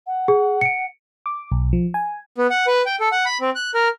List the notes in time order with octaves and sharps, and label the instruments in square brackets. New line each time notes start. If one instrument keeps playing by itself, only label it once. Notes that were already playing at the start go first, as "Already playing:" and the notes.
[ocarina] F#5
[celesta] G#4
C#7 D7
[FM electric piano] D6
B1
F3
G#5
[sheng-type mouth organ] B3
F#5
B4
G5
A4
F#5
B5
C4
F#6
A#4